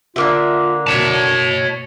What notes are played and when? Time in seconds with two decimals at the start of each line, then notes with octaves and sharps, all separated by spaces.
0.16 D3 A#3 F4 E5
0.87 B2 C#5 A5